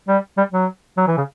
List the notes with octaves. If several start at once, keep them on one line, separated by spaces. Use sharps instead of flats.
G3
G3
F#3
F#3
E3
C#3